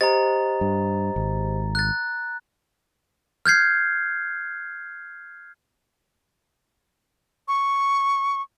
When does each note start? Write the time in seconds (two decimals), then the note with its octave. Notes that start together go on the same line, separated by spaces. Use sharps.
0.01 G4 C5 D#5 A#5 A6
0.61 G2
1.16 G#1
1.75 F#6 A6
3.46 F6 G6 G#6 C7
7.48 C#6